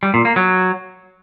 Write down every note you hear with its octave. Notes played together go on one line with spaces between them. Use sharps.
G3
A#2
A#3
F#3